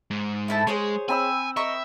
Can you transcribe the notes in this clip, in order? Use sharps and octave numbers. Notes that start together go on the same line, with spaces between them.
G#2
A3 E4 A5
G#3 G#4 C5 C#5
C4 G#5 B5 E6
A#4 D#5 E5 C#6